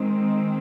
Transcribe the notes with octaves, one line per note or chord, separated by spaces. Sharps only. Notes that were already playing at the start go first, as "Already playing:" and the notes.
Already playing: D#3 G#3 C4